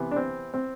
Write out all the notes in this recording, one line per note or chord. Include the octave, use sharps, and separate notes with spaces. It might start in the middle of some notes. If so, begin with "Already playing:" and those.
Already playing: C3 E3 B3
D4
C4
C4